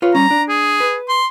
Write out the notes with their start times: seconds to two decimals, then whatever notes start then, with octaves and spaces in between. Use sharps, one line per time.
0.02 F4 B4 C#5
0.15 G3 C#4 A#5
0.31 D4
0.49 G#4
0.80 B4
1.09 C6